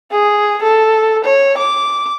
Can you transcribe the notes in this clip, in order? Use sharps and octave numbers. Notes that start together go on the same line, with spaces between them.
G#4
A4
C#5
D6